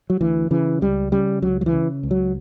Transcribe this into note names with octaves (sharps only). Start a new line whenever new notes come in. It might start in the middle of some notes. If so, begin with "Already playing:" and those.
F#3
D2 E3
C#3 E3
C#2 G3
C#3 G3
C#2 F#3
F#3
E3
C#3
C#2
F#3